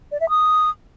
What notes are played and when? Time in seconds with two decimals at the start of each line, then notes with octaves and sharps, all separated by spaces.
0.12 D5
0.20 E5
0.29 D#6